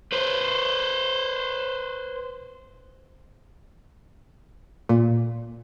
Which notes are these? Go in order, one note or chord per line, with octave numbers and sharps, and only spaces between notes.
B4 C5
A#2